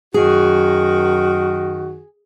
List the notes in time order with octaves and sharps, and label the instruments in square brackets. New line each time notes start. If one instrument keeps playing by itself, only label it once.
[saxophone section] F#2 D#3 F#4 [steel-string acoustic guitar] G#4